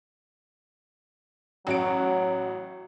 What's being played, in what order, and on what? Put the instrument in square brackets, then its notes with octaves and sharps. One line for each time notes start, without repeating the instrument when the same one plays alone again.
[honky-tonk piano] A1 F#4 D7 [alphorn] F#3